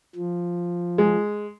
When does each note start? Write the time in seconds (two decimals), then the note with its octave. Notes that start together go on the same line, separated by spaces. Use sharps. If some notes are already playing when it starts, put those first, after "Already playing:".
0.16 F3
0.98 G#3